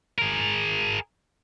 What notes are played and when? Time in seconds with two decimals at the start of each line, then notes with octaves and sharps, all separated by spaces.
0.19 G#4 A#4